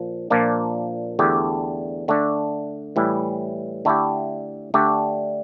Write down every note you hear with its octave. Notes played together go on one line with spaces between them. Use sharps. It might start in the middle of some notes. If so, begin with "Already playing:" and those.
Already playing: A#2 F3
A#2 F3 A#3 D4
E2 D3 A3 D4 G4
D3 A3 D4
A2 E3 G3
D3 A3 E4 G4
D3 A3 D4 G4